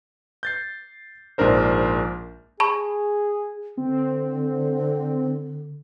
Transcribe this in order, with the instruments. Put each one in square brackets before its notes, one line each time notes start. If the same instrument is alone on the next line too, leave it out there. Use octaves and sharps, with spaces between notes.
[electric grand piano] G6 A6 C7
A#1 G#2 D4 A#4 C5
[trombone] G#4 [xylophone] A5 B5 C#6
[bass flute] D3 [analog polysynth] C4